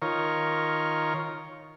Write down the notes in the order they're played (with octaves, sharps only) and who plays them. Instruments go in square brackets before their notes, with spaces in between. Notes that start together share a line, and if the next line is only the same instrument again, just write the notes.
[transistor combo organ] D#3 F4 A#4 C#5